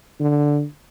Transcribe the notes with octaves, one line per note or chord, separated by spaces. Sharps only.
D3